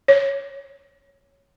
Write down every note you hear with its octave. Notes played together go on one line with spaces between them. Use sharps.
C#5